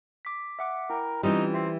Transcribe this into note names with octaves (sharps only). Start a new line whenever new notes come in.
D6 B6
E5 F#5 D6
E4 A#4 G5
E3 G3 C4 C#4 D#4 F4
C4 E5